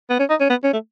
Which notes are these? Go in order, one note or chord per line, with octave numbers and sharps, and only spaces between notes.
B3
C#4
D#4
C#4
B3
C#4
A3